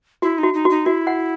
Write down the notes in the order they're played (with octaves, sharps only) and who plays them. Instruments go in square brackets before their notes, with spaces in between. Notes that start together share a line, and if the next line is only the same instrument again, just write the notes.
[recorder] E4 [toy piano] F#4
[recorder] D#4
[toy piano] F#4
[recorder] D#4
[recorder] D#4 [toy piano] F#4
[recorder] E4 [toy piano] F#4
[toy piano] F#5